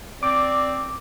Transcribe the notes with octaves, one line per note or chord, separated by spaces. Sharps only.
C4 D5 D6